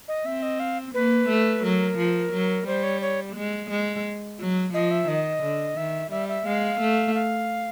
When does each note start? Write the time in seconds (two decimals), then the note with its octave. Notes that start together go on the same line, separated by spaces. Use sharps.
0.08 D#5
0.25 C4 E5
0.43 D#5
0.60 F5
0.94 A#3 B4
1.29 A3
1.63 F#3 A#4
1.98 F3
2.32 F#3
2.67 G3 C5
2.83 C#5
3.01 C#5
3.35 G#3
3.70 G#3
4.40 F#3
4.73 F3 D#5
4.91 E5
5.08 D#3 D#5
5.42 D3
5.77 D#3 E5
6.11 G3 E5
6.29 E5
6.46 G#3 F5
6.80 A3
7.15 F5